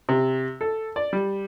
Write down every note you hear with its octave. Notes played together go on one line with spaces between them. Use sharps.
C3
A4
D5
G3